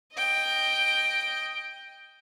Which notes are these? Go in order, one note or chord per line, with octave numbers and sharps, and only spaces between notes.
D#5 G5